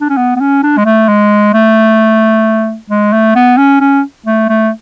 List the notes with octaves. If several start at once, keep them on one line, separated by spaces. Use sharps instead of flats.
D4
C#4
B3
B3
C#4
D4
G#3
A3
G#3
A3
G#3
A3
B3
C#4
C#4
A3
A3